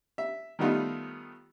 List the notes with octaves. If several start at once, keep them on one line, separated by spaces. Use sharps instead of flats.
E5
D#3 G3 A3 B3 D#4 F4